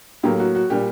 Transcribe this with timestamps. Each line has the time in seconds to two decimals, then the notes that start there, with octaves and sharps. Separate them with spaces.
0.23 A2 F#3 A#3 G4
0.39 F#4
0.55 F#4
0.70 A#2 G3 G4